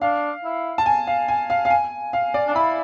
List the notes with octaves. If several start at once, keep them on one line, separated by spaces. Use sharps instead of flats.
D4 F5
E4
A5
G#5
F5
G#5
F5
F5
G#5
F5
D5
D4
E4 B5